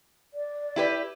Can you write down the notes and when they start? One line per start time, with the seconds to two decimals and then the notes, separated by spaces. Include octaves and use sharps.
0.34 D5
0.76 E4 G4 B4